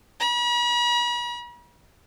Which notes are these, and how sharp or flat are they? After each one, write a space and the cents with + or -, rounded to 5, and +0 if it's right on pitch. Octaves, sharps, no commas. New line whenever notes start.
B5 -45